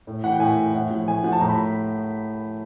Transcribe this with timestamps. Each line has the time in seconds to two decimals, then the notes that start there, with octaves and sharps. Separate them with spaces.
0.07 A2
0.23 E3 F#5
0.32 G5
0.40 A2 G#5
0.57 E3
0.74 A2 F#5
0.90 F3
1.07 A2 G#5
1.24 F3 F#5
1.32 A5
1.40 A2 A#5
1.49 B5